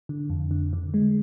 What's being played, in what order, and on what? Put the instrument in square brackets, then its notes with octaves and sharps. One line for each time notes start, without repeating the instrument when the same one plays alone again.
[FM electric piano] D3
F2
D3
D3
G#3